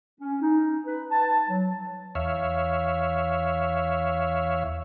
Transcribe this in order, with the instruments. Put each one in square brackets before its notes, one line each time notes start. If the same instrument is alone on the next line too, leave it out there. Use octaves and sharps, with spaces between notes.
[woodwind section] C#4
D#4
B4
A5
F#3
[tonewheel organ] E2 C#5 E5 F5